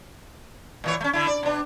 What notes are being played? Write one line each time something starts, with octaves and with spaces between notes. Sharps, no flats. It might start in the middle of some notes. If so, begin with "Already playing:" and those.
A#2 E3 C#5
A3 C#4
D3 E4
D5
B2 D4